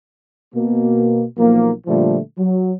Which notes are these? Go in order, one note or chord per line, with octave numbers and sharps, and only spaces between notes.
B2 A#3
B1 F3 A#3
A#2 D3 F3 G3 A3
F#3